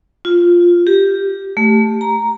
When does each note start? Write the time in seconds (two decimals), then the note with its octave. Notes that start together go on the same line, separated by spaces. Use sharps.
0.25 F4
0.87 G4
1.57 A3
2.01 A#5